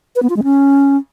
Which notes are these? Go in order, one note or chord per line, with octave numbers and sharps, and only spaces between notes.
B4
B3
F4
G#3
C#4